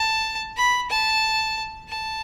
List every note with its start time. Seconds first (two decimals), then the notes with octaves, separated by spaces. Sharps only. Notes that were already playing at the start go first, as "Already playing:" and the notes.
Already playing: A5
0.57 B5
0.90 A5
1.89 A5